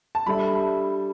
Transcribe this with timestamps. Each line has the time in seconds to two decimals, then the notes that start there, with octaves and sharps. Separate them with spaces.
0.15 A5
0.26 G3 D4 A4 E5 B5